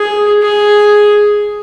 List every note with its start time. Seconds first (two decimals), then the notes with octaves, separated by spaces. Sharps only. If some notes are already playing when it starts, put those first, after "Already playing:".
Already playing: G#4
0.42 G#4